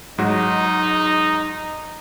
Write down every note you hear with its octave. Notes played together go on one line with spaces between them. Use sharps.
G#2 F#3 D#4 F#4